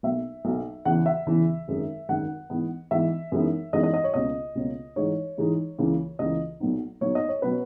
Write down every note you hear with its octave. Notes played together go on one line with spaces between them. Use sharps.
B1 B2 A#3 E5
B1 B2 A#3
E2 C#3 E3 F#5
E5
E2 C#3 E3
G#1 F#2 D#3 G#3
G#1 F#2 D#3 G#3 F#5
G#2 E3 B3
G#2 E3 B3 E5
F#2 E3 G#3 B3 D#4
F#2 E3 G#3 B3 D#4 D#5
D#5
D#5
C#5
C#2 B2 A#3 C#4 D#5
C#2 B2 A#3 C#4
G#2 E3 G#3 D#4 C#5
G#2 E3 G#3 D#4
C#2 C#3 E3 A#3
C#2 C#3 E3 A#3 D#5
B1 A#2 F#3 B3 D#4
B1 A#2 F#3 B3 D#4 C#5
D#5
C#5
B2 F#3 C#4 B4